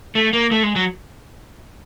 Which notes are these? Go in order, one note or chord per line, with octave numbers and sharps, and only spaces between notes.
A3
A#3
A3
G#3
F#3